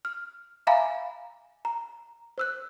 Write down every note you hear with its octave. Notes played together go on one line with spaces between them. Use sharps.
F6
E5 F5 G#5 A#5 B5 D6
A#5
C5 E6 F#6